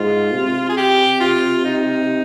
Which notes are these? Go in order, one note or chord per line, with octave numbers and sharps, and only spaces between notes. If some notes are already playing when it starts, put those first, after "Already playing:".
Already playing: G#2 F4
C3
G#4
G4
F4
D#4